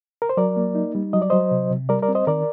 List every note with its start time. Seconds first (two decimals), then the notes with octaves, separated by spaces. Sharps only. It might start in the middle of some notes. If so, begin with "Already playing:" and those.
0.22 A#4
0.29 C5
0.37 F#3 A#4 D5
0.57 A#3
0.75 D#4
0.95 G3
1.13 F#3 D#5
1.22 D5
1.30 F#3 C5 D#5
1.51 C3
1.71 C3
1.89 G3 A#4 D5
2.03 A#4 D5
2.09 C4
2.15 C5 D#5
2.27 D#3 A#4 D5